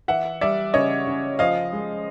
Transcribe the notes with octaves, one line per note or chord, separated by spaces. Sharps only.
E3 E5 F#5
G3 D5 E5
C#3 C#5 D#5
C#3
F3 D#5 F5
G#3